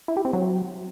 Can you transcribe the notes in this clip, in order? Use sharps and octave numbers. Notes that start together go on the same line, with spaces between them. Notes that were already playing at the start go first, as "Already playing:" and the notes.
E4
G4
C4
F#3